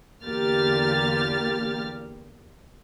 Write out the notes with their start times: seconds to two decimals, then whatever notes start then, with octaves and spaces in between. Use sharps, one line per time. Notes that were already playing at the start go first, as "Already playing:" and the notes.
0.23 E2 D3 A#3 G4 F6 A6